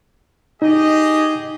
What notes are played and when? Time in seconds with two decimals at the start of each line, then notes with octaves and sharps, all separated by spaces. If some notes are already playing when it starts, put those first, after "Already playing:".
0.62 D#4 G4 G#4 D#5